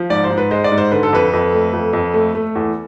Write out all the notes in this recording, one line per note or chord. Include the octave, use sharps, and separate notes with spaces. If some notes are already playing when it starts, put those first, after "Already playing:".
Already playing: F3
G#2 D5
C5
G#2
B4
G#3 C5
D5
G#2
C5
D3 B4
A4
F2 B4
F2
A3
F2
F2
A3
A3
E2